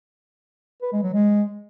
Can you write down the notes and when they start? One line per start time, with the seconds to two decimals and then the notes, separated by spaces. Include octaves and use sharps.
0.82 B4
0.93 G#3
1.03 F#3
1.14 G#3